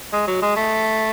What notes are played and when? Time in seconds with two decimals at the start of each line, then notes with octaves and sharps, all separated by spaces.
0.13 G#3
0.27 F#3
0.42 G#3
0.56 A3